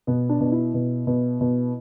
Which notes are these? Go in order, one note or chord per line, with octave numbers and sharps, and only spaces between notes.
B2 B3
D4
B2
E4
B2
B2
B2